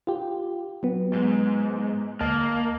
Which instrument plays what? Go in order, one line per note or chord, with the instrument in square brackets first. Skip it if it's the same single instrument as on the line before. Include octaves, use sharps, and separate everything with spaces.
[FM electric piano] F4 G4
F#3 B3
[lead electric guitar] G#2
[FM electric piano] D2 D#5 A5 [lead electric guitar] A#3